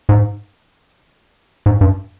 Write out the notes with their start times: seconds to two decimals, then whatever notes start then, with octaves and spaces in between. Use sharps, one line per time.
0.09 G#2
1.66 G#2
1.81 G2